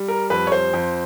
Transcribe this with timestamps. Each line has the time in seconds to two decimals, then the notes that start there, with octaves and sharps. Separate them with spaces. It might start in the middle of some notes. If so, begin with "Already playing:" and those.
Already playing: G3
0.08 A#4
0.30 F2 B4
0.47 C#5
0.52 C5
0.73 F2